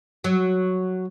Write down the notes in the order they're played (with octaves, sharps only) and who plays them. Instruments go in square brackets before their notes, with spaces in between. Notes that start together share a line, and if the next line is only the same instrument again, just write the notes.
[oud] F#3